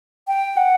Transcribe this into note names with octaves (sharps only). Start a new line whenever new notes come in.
G5
F#5